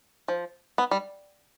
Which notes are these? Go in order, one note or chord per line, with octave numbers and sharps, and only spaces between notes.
F3
B3
G3